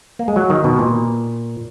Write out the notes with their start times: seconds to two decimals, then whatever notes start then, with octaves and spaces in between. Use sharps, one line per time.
0.19 A#3
0.28 G#3
0.36 F#3
0.50 D#3
0.64 B2
0.79 A#2